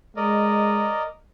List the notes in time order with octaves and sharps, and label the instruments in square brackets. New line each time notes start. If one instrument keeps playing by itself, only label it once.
[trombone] G#3 [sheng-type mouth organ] A#4 D5 D#5